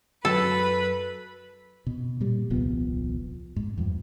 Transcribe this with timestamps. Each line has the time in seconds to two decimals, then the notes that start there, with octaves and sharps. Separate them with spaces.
0.25 F#2 F#3 A4 B4
1.87 B2
2.21 A#2 G3
2.50 D#1 C2 F3 B3
3.56 G#2
3.77 E2 G2 F3